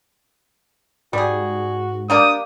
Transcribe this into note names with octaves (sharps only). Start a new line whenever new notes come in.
G#2 G3 F#4 G#4
G3 A#3 D4 G4 D#6